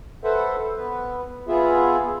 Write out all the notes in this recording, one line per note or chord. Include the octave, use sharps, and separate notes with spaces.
A4 B4 C5 E5 F#5
B3 B4
B3 F4 G#4 E5